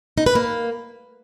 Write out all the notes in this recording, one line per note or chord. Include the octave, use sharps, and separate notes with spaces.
D#4
B4
A#3